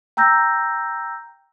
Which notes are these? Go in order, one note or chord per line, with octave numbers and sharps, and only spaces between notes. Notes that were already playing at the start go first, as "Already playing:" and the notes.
G5 A#5 E6 G6 A#6